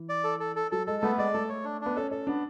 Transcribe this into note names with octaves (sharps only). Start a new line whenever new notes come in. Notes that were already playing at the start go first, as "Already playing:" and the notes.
Already playing: E3
D5
A4
A4
A4
F#3 A4
G#3 A4
A3 B3
G#3 D5
A3 A4
C#5
D4
B3 D4
C#4 A4
C#4 A4
B3 D4